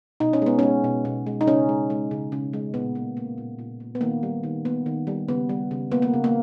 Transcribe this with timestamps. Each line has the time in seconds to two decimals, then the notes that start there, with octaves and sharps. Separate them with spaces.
0.20 B2 D#4
0.33 C#4
0.42 G#3 B3
0.59 G#3 C#4
0.84 B2
1.05 B2
1.27 G#3
1.41 D#4
1.47 C#3 C#4
1.69 G#3
1.90 G#3
2.11 C#3
2.32 C#3
2.53 G#3
2.74 A#2 B3
2.95 A#3
3.17 A#3
3.38 A#2
3.59 A#2
3.80 A#3
3.95 B3
4.01 D#3 A#3
4.23 G3
4.43 D#3
4.65 A#3 B3
4.86 D#3
5.07 G3
5.28 C#3 B3
5.49 G3
5.71 C#3
5.91 A#3 B3
6.02 A#3
6.13 C#3
6.24 A#3